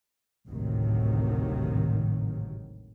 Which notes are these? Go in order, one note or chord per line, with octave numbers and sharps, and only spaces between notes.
G#1 D2 A2 C3 D#3 F#3